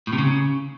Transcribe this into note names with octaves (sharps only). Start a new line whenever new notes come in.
A2
C3
C#3